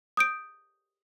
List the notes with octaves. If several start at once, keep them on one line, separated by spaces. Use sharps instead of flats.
D#6 G6 D7